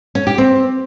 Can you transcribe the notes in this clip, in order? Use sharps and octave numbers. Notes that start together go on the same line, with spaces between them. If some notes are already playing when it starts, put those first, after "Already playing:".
C#4
G4
C4